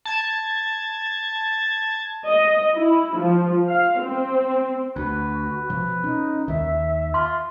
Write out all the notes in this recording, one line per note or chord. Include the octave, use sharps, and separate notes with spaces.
A5 G#6
D#5
E4
F3
F5
C4
D2 F#4 B4
B2 F3
C#4 D#4
D#2 D#3 E5
F4 C6